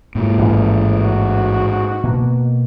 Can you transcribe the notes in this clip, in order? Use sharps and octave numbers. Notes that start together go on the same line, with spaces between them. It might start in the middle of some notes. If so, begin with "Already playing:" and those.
G#2 A#3
A1
F#4
B2 A#3